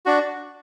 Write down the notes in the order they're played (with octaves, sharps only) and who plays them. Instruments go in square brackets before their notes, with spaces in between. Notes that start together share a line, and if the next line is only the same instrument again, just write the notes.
[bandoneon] D4 F#4